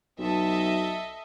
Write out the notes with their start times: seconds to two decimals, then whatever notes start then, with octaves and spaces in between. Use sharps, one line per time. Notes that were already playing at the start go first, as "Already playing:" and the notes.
0.19 B1 A4 D#5 E5